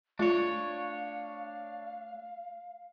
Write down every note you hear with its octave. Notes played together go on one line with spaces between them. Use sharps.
A3 D4 F4 C#5 F5